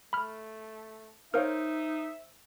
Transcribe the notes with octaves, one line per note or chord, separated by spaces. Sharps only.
A3 B5 F6
D#4 A#4 C5 C#5 E5 F5 F6